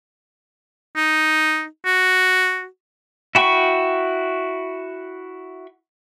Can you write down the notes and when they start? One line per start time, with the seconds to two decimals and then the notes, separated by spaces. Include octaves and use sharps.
0.96 D#4
1.85 F#4
3.35 E4 F#4 G5 B5 C#6